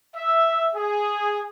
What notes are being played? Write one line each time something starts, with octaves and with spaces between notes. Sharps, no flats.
E5
G#4